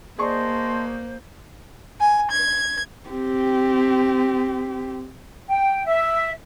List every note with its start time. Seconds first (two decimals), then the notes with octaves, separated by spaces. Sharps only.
0.19 A#3 G#4 C5 D5 D#5 A5 C6 C#6
2.00 G#5
2.31 G#6
3.09 C4 G4
5.48 G5
5.86 E5